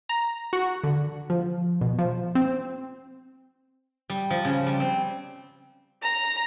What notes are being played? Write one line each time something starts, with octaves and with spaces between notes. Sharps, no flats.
A#5
F#4
D3
F3
B2
F3
C4
G3
F3
C#3
G3
C4
A#5